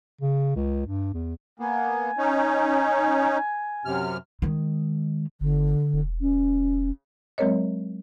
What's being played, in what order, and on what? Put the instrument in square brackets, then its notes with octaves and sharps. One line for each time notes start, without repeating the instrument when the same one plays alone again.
[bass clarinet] C#3
C#2
G2
E2
[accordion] A#3 B3 [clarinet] G#5
[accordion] C#4 D#4
F#2 C3 F6
[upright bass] D#3 G#3
[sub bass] G1 [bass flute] D3
[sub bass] E1
[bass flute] C#4
[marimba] F#3 G#3 C4 A#4 C#5 D#5